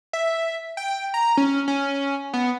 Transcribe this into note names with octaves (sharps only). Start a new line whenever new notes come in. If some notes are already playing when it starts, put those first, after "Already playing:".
E5
G5
A#5
C#4
C#4
B3